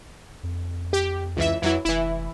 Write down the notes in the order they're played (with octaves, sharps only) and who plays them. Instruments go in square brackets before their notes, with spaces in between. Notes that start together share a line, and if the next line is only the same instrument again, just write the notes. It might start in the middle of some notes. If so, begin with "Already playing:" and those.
[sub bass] F2
[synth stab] G4
C#2 E3 E5
[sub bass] F2 [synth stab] E3 F#3 E4
[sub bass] F1 [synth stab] E3 E4